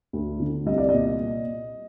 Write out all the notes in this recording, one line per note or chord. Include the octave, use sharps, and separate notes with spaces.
D2
D3
C2 D#5
D5
A#2 D#5